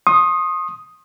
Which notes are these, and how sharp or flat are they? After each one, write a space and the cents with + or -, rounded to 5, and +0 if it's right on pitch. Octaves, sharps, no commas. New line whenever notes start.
C6 +40 D#6 +0